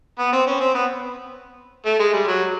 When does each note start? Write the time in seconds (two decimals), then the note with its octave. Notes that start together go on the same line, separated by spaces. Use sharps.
0.19 B3
0.33 C4
0.46 C#4
0.60 C4
0.75 B3
1.86 A3
1.99 G#3
2.13 G3
2.28 F#3